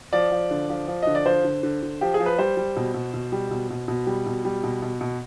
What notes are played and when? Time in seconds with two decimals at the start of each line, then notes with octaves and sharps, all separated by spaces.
0.13 F3 D5
0.31 F3
0.51 D3
0.69 F3
0.88 F3
1.02 D3 D#5
1.15 D5
1.26 F3 C5
1.44 D3
1.63 D3
1.83 D3
2.01 F3 G4
2.14 G#4
2.20 F3
2.26 B4
2.39 G3 C5
2.57 G3
2.76 B2
2.94 B2
3.14 B2
3.32 G3
3.51 B2
3.70 B2
3.88 B2
4.07 G3
4.26 B2
4.45 G3
4.63 B2
4.82 B2
5.01 B2